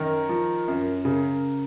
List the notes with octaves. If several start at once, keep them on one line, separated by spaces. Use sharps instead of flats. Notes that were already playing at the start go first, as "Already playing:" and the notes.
Already playing: F#2 D#3 A#4
F3
F#2
C#3